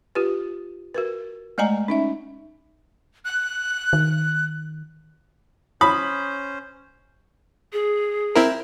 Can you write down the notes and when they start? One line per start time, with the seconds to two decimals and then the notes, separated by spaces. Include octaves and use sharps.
0.15 F4 G4 B4
0.94 F#4 A#4 B4
1.58 G#3 A3 D5 D#5 G#5 A#5
1.88 C#4 D#4 E5
3.25 F#6
3.93 D#3
5.81 C#4 C5 B5 D#6
7.73 G#4
8.35 C4 E4 A#4